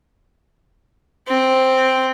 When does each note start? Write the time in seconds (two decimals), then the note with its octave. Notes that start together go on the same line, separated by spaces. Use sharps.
1.28 C4